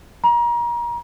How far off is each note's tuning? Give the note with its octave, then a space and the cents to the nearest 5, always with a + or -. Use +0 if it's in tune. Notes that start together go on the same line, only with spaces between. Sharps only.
A#5 +30